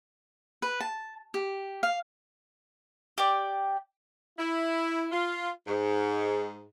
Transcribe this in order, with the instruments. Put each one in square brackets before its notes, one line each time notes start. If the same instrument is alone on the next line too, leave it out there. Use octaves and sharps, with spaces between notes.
[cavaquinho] B4
A5
G4
F5
[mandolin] G4 D5
[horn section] E4
F4
G#2